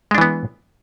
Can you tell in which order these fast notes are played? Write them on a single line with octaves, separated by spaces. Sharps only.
G#3 D4 E3 B3